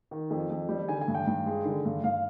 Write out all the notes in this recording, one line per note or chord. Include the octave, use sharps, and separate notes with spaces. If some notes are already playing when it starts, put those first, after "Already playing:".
D#3
F2
F2
G3
D3 G#5
G#5
G2
G5
G2
G#3
D3
G2
G2 F5